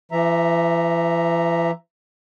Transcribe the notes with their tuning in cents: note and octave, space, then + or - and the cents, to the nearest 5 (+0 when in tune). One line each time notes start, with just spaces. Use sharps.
E3 +40 E5 +0 A#5 +0